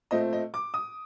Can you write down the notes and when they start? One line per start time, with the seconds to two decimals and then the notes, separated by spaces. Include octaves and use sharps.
0.11 A#2 A3 C4 D#5
0.33 D#5
0.54 D6
0.74 D#6